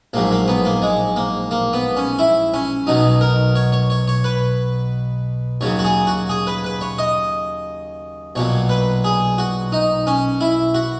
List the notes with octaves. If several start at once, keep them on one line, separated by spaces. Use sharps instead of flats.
A#1 G#2 F#3 A#3
A#3
B3
A#3
G#3
A#3
A#3
B3
C#4
E4
C#4
B1 B2 F#3 D#4
A#4
C#5
C#5
C#5
C#5
B4
D#2 C#3 F#3 C#5
F#4
G#4
F#4
G#4
B4
B4
C#5
D#5
B1 A#2 F#3 C#5
B4
G#4
F#4
D#4
C#4
E4
F#4